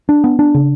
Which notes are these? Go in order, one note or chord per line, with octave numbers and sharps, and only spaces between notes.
D4
B3
D4
C#3